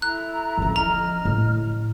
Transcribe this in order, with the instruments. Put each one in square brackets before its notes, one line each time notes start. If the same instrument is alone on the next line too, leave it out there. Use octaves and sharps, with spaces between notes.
[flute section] E4 A4 A#5 [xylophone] F#6
[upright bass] F3 C#4
[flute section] D#5 F6 [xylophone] A#5
[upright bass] A2